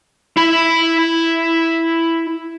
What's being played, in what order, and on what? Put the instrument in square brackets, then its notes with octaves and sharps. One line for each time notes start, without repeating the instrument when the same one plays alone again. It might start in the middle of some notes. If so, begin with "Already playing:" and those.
[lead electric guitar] E4 B5